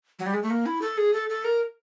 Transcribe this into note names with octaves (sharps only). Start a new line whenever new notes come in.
F#3
G3
G#3
A3
A#3
E4
A4
G#4
A4
A4
A#4